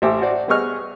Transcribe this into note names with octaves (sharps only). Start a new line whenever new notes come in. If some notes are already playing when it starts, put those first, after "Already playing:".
A1 G4 C5 E5 D6
F#4 C5 D5
G3 B3 G#4 D#5 C#6 F6